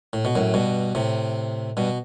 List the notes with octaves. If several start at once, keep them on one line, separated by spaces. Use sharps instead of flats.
A2
B2
F#2 A2
G2 B2
A2 C3
G2 B2